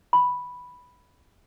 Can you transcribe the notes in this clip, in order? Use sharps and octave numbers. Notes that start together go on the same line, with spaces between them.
B5